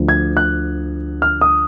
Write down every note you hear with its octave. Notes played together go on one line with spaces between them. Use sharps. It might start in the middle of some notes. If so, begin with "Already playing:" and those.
Already playing: D2 D3 F3
G#6
F#6
F6
D#6